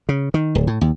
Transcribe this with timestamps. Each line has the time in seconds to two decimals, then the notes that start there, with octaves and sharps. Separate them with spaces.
0.09 C#3
0.34 D#3
0.55 D1
0.67 A2
0.81 D#2